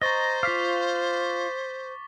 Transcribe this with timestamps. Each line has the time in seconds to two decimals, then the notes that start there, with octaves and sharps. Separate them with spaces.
0.02 C5 D#5 A#5 C#6 A6 G7
0.43 F4 F5 D6 B6